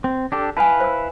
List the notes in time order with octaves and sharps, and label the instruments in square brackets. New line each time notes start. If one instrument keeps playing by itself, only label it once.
[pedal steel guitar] C4
D4 G4 A4
[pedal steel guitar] E4 B4 F5 [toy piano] G#5 A5
[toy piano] C5 E6